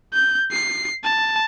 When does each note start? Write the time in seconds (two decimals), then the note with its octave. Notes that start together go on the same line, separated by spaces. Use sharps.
0.13 G6
0.52 C7
1.04 A5